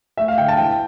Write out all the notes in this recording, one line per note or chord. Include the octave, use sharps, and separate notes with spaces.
A3 E5
F5
D3 G5
A5
E3 G5